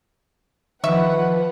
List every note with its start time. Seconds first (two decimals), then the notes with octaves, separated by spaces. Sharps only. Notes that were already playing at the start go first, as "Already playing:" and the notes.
0.84 D#3 F3 B4 E5 F#5 C#6